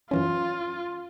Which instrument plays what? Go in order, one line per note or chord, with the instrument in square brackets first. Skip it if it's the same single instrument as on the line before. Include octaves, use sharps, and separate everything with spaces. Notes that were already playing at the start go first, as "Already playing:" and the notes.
[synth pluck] F#2 E3 C#4 [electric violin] F4